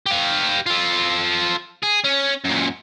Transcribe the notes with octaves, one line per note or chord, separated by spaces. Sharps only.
G4 F5
F4 A4
G#4
C#4
F#2 A#2